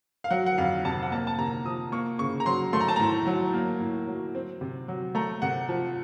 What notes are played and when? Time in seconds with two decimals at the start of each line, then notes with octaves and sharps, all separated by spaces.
0.24 F5
0.31 F#3 F#5
0.46 F#5
0.58 F2 F5
0.85 C3 A5
1.03 F#5
1.12 A#3 A5
1.27 A5
1.38 C3 A#5
1.65 F3 D#6
1.92 A#3 C#6
2.19 C#3 C#6
2.40 A#5
2.46 F#3 C6
2.73 A3 C6
2.81 A#5
2.88 A5
2.96 A2 A#5
3.27 F#3
3.53 A#3
3.80 A2
4.07 F#3
4.35 C4
4.61 C3
4.88 F#3
5.15 A3 A#5
5.42 C3 F#5
5.69 F3